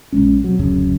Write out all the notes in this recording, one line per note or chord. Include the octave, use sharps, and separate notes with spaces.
A#1 F#2 G#3 C#4
C3 F#3
D1 F#2 C#3